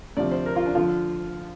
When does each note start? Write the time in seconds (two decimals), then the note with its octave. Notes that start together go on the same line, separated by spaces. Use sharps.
0.17 D2 C3 F3 D5
0.31 C5
0.46 A#4
0.56 F4
0.66 D4
0.75 D3 F3 F4